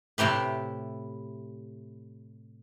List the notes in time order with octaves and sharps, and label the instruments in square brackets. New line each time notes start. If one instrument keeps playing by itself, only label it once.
[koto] A2 C3 E4 G4 B4